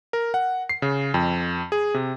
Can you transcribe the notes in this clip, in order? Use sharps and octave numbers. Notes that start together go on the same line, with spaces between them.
A#4
F#5
C7
C#3
F2
G#4
C3